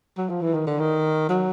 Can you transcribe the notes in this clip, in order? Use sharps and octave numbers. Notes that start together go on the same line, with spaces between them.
F#3
F3
E3
D#3
D3
D#3
F#3